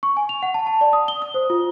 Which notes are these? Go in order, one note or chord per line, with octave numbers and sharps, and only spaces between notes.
C#6
G#5
F7
F#5
A5
A5
D5
D#6
G7
D#6
C5
F4